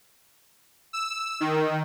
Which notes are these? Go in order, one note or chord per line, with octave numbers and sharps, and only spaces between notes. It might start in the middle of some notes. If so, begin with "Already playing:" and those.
E6
D#3